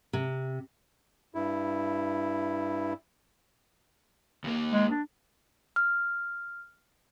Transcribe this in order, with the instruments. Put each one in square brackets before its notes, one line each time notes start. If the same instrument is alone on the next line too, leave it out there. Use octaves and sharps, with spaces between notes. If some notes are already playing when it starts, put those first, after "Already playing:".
[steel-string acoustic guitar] C3
[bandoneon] G2 E4
[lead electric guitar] D#2 A#3
[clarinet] G#3
D4
[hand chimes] F6